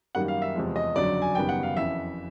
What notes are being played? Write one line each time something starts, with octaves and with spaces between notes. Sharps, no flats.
F#2 D#3 G3 A#3 F#5
F5
E5
E2 C3 F3 G#3
D#5
G1 F2 C#3 F#3 D5
G#5
F#1 F#2 D#3 G3 B3 G5
F#5
F5
F2 C#3 E3 E5